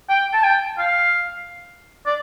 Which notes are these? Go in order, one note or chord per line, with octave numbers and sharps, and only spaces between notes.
G5
A5
G5
F5
D5